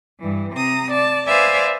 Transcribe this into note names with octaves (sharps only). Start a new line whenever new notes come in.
G2 E3
C3 A#5 D#6
D5 A5
B4 C5 D5 E5 F5 G#5